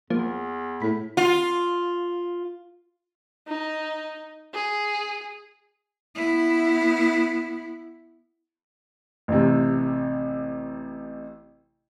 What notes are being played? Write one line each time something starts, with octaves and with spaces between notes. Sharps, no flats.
E2 F3 A#3
A2 B5
F4
D#4
G#4
B3 E4
A1 C3